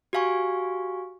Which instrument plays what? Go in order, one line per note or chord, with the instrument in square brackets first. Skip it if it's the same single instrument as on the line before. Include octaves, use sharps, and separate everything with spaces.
[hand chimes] F#4 G4 F5 G#5 C#6